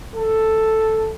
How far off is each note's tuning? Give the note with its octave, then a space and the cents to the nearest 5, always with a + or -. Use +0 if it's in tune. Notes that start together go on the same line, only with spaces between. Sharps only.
A4 +0